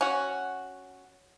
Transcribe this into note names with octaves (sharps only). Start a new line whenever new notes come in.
C#4 F#4